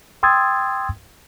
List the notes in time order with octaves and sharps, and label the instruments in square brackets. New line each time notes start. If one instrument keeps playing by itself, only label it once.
[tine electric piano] G5 C6 D#6 E6 G#6 A6